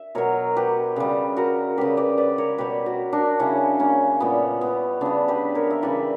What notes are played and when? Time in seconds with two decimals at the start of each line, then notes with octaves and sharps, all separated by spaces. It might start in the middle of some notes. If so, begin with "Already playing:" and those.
Already playing: E5
0.15 B2 F#3 A#4 C#5
0.57 G4 B4
0.96 C#3 G3
1.36 F#4 A#4
1.77 C#3 G3 G4 B4
1.97 B4 D5
2.17 B4 D5
2.38 A#4 C#5
2.58 B2 G3 G4 B4
2.86 F#4 A#4
3.13 D4 F#4
3.39 C#3 G3 C#4 E4
3.79 A#3 C#4
4.20 A#2 G3 B3
4.61 B3
5.01 C#3 G3 B3 D4
5.28 G4 B4
5.55 A#4 C#5
5.70 E5
5.82 C#3 E3 G3 B4 D5